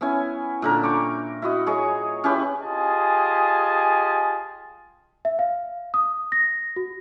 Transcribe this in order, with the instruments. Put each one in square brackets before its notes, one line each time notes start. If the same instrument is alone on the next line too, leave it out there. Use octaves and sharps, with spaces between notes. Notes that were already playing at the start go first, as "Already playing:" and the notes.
[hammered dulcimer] B3 C#4 E4 G#5
A#2 D3 A#4
G5 C#6 D6
E4 F#4 D#5
G#4 C#5 D#5
C#4 E4 G4 B4
[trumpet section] F4 G4 G#4 D#5 G#5 A5
[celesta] E5
F5
D#6
A#6
F#4